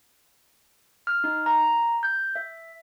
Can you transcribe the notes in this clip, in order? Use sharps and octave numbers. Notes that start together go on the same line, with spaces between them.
F6
D#4
A#5
G6
E5